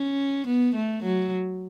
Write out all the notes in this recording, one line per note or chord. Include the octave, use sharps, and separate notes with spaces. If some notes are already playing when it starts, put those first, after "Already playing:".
Already playing: C#4
B3
A3
F#3